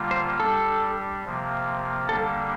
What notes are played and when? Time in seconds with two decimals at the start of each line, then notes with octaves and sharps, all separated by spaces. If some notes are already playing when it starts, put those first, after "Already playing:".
Already playing: D3 G3 A#3 F4
0.11 C5
0.39 G3 D4 G4 A4
1.25 C3 F3 A#3
2.09 D3 G3 A#3 D4 A4